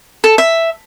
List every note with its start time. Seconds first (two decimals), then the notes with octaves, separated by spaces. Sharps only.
0.24 A4
0.38 E5